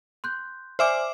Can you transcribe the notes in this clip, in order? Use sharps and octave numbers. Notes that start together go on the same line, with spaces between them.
C6 F#6 G6
C5 D5 E5 G#5 D6 F6